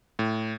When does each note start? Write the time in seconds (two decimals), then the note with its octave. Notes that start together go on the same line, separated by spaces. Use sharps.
0.19 A2